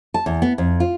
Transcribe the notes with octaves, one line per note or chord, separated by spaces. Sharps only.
A5
E2
B3
F2
F4